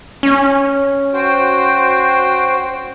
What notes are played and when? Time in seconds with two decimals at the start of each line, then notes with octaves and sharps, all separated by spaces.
0.23 C#4
1.14 F#4 C5 G5